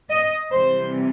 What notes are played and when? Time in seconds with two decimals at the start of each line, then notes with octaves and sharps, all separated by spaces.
0.10 D#5
0.51 C3 E3 G3 C5